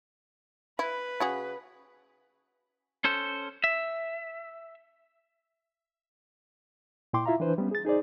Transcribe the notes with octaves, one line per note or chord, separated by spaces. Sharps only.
E4 B4
C#3 F#4 G#4
C#4 A4 C5
E5
A#2 E4 G5 C6 D6
E4 F4 E5 F5 A#5
E3 D4 B4 C5
G3 B3 C#4
G#4 A6
D#4 G#4 C5 D5